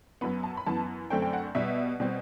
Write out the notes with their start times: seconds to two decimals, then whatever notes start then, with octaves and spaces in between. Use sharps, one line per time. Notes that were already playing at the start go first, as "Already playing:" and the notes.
0.21 F#2 F#3 B3 B5
0.43 A5
0.57 B5
0.66 F#2 E3 B3 A5
1.10 F#2 D3 A3 C4 G5
1.22 G5
1.33 F#5
1.55 B2 G3 B3 E5
2.00 B2 G3 C4